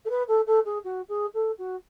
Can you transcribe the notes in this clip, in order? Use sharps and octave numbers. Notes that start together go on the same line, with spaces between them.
A4
B4
A4
A4
G#4
F#4
G#4
A4
F#4